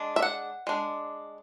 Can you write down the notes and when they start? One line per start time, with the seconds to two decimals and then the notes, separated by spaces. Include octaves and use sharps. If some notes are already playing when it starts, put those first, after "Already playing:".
Already playing: G#3 D4
0.16 E5
0.22 F#5
0.67 G#3 D4